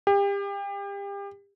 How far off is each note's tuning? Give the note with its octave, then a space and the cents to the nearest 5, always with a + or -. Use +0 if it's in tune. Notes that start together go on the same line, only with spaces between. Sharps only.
G4 +35